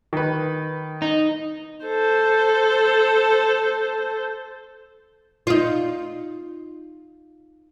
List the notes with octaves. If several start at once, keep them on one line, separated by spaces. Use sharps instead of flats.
D#3 B4
D#4
A4 C5
D#4 F4